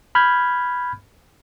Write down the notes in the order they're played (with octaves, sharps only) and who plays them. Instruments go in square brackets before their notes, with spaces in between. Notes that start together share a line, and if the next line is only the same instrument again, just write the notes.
[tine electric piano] B5 F6 G6 G#6